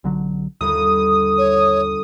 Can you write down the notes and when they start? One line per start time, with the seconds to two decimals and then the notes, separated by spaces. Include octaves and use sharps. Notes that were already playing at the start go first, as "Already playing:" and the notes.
0.04 B1 D3 F#3
0.61 G1 D#2 D#6
1.38 C#5